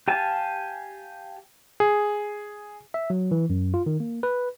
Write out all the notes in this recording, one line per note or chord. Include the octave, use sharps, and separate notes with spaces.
G4 F5 G#5 A5
G#4
E5
F#3
E3
F#2
F4
D#3
A#3
B4